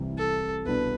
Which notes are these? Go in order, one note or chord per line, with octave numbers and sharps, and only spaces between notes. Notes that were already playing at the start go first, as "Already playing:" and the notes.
Already playing: C2 C3 E3
A4
C2 B2 B3 D4 B4